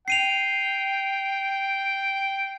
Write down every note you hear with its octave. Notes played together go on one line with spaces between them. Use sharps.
G5 C7 D#7 F7